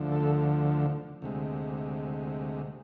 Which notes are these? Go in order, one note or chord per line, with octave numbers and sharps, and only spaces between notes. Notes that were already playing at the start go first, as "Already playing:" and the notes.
Already playing: D2 D3 F3
A4
D2 C3 G#3